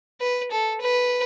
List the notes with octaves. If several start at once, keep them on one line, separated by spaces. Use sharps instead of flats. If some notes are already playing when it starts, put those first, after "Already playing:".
B4
A4
B4